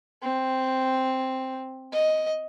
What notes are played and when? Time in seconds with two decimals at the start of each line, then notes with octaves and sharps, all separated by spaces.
0.23 C4
1.93 D#5